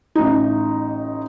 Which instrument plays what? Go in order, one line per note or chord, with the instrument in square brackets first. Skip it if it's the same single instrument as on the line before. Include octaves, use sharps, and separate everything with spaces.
[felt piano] A1 D#4